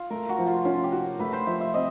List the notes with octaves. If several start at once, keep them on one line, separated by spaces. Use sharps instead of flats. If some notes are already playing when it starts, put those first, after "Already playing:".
Already playing: F4
A3 A#4
F#4
F3
F4
C#4 F4
G4
F#4
A3 B4
C5
F3 E5
E5
C4 D#5